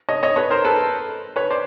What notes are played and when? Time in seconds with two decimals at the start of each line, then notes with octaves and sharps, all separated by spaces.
0.09 C#5 D#5
0.23 C#5 D#5
0.36 B4 C#5
0.50 A#4 C5
0.65 A4 B4
1.36 B4 C#5
1.50 C5 D5